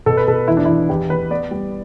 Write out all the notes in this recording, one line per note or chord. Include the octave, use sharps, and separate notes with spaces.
B2 A4
B4
B2 A4
E2 E4
D4
E2 E4
E2 G4
E2 B4
B3 D5
G3